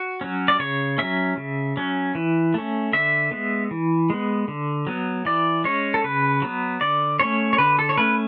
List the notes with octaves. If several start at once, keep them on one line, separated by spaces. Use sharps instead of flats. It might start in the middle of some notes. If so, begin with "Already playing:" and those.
Already playing: F#4
F#3 C#4
D5
C#3 C#5
F#3 C#4 E5
C#3
F#3 C#4
E3
A3 C#4
D3 E5
G#3 B3
E3
G#3 B3
D3
F#3 B3
E3 D5
G#3 C#4 C#5
A4
C#3 B4
F#3 B3
D3 D5
A3 C#4 C#5
C#5
D3 B4
A4
C#5
A3 C#4 B4